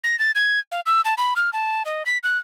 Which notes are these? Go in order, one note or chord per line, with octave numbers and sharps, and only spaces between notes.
A#6
A6
G#6
F5
E6
A5
B5
F6
A5
D#5
B6
F#6